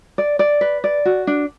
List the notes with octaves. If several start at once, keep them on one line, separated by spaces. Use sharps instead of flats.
D5
D5
B4
D5
F#4
D4